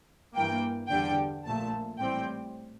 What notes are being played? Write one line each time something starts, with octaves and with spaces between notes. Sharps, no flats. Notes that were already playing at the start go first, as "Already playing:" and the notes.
G2 E3 A#3 G5
E2 D3 G3 D4 G5
A#1 A#2 A3 A5
A1 A2 G3 C4 G5